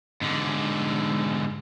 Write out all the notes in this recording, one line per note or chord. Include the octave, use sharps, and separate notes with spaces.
G#2 D3